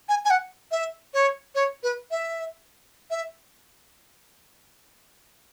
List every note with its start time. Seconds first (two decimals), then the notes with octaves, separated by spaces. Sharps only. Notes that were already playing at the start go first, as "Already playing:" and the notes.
0.09 G#5
0.25 G#5
0.30 F#5
0.71 E5
1.14 C#5
1.55 C#5
1.83 B4
2.11 E5
3.10 E5